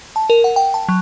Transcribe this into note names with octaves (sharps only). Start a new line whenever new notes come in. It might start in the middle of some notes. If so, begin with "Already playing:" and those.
A5
A#4
F#5
G5
A5
F#3